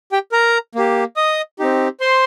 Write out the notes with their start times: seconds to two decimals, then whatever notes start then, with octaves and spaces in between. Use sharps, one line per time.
0.12 G4 G5
0.32 A#4 A#5
0.75 A#3 G4
1.16 D#5 D#6
1.59 C4 D#4 G4
2.00 C5 C6